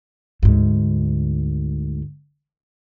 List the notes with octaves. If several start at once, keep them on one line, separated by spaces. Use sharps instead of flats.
D2 G#2